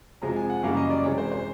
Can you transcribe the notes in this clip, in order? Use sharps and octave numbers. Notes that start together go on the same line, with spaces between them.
F2 C3 F3 G#3 A#5
G#5
F#5
F#2 C#3 E3 G3 A#3 F5
D#5
D5
C3 E3 G#3 C#5
C5
C5